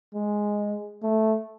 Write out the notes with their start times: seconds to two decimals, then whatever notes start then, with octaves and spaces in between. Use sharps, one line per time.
0.14 G#3
1.02 A3